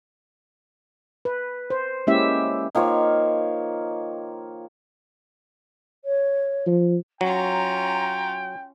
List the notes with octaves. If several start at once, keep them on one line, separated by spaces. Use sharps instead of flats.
B4
C5
G#3 A#3 C#4 E4 G4 E5
D#3 F3 A#3 C#5
C#5
F3
F#3 C#4 F4 G5 A#5